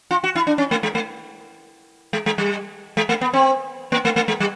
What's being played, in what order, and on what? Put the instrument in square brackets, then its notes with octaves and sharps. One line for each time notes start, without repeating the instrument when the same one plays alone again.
[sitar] F4
F#4
E4
D4
C#4
A3
G#3
A3
G#3
G#3
G3
G#3
A3
B3
C4
A#3
A3
A3
G#3
G3